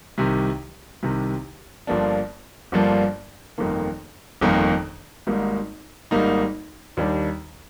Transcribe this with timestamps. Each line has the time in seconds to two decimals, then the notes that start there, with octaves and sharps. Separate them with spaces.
0.18 C2 C3 D#3
1.03 C2 C3 D#3
1.87 G1 G2 F3 A#3 D4
2.72 G1 G2 F3 A#3 D4
3.58 G1 F2 D#3 A#3
4.41 G1 F2 D#3 A#3
5.27 G#1 G#2 G3 A#3 D#4
6.11 G#1 G#2 G3 A#3 D#4
6.97 D#2 D#3 G3 D4